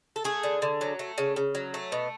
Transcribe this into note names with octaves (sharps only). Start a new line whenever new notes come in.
A4
A3 G#4
D3
D3
F#3
A3
C#3
C#3
F#3
A3
B2